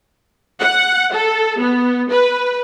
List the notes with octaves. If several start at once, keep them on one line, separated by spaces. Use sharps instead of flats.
F#5
A4
B3
B4